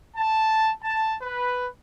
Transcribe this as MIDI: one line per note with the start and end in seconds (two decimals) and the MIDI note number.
0.16 0.71 81
0.83 1.15 81
1.21 1.67 71